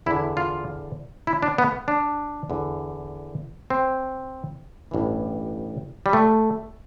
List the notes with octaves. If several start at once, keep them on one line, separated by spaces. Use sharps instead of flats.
E2 D3 E4
F4
E4
D4
B3
D4
E2 D3
C4
A1 G2 E3
G3
A3